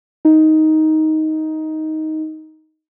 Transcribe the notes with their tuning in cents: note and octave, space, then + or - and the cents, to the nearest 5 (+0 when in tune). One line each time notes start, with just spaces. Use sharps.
D#4 +10